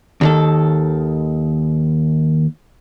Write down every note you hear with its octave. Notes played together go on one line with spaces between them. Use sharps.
D#2 D#3 A4